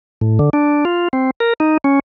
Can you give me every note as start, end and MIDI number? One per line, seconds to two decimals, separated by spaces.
0.21 0.39 45
0.39 0.50 50
0.53 0.85 62
0.85 1.08 65
1.13 1.31 60
1.40 1.53 70
1.60 1.77 63
1.84 1.99 61